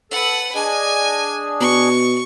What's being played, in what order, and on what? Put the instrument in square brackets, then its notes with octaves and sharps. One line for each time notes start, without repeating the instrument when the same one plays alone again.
[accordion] A4 [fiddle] B4 F#5
[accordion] D4 G#4 D#5 [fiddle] G#5
[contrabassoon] B2 [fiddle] C#6